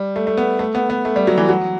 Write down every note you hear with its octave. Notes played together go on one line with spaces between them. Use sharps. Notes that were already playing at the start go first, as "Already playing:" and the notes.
Already playing: G3
A3
A3
B3
A3
B3
B3
A3
G3
F#3
E3
F#3